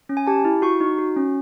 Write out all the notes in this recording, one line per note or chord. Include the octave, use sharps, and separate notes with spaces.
C#4
G#5
G4 A5
E4
F#4 C#6
D#4
F#4
C#4